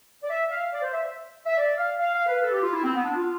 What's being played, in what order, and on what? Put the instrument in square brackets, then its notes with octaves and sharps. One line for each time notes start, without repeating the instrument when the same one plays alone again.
[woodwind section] D5
E5
F5
D5
C5
E5
E5
D5
F5
F5
F5
B4
A4
G4
F4
E4
C4
B3
D4
F4